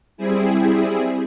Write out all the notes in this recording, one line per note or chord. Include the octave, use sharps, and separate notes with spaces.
G3 C4 E4 G#4